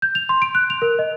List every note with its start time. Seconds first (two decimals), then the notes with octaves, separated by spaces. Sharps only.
0.02 G6
0.15 F7
0.29 C6
0.42 D7
0.55 F#6
0.70 F7
0.82 A#4
0.99 D#5